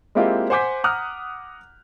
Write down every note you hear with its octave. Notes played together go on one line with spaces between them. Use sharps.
G#3 A#3 C4 E4 F4 G4
C5 F#5 G#5 D6 G6 B6
F#5 A#5 D6 D#6 F6 F#6